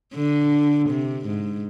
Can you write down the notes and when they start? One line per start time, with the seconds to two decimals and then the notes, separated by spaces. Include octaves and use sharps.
0.14 D3
0.89 C3
1.26 G#2